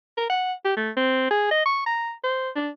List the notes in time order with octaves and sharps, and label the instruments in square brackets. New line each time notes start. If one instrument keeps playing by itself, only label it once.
[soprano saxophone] A#4
F#5
G4
A3
C4
G#4
D#5
C#6
A#5
C5
D4